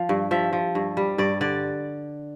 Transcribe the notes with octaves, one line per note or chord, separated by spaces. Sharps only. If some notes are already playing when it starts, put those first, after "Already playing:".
Already playing: F3 F5
G2
F3 E5
F3
G2
G3
G2 D5
D3 D5